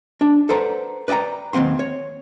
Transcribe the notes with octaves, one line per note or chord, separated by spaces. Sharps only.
D4
A4 B4 C5 D5 F#5 A#5
B4 D5 D#5 G5 A#5
D#2 E3 C4 F#5 C6
C#5